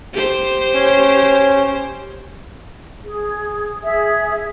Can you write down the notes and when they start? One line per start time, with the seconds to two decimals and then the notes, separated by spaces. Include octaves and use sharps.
0.13 G4 C5
0.74 C#4
3.04 G#4
3.82 G#4 E5